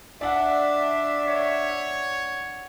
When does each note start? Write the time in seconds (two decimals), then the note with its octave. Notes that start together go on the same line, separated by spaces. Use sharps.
0.21 D4 D5 E5 F#5
1.28 C#5